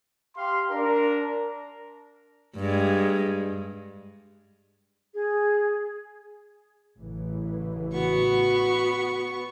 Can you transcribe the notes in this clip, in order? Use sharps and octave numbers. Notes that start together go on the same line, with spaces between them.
G4 F5 C6
D4 A#4
G2 G#3
G#4
A1 C#3 E3
B3 F#4 C#6